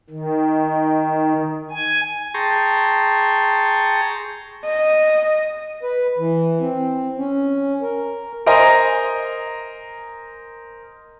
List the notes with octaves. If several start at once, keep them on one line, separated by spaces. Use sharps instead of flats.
D#3
G#5
G#4 G5 A5 A#5 C6 C#6
D#5
B4
E3
C4
C#4
A#4
A#4 C5 D#5 G#5 A#5 C6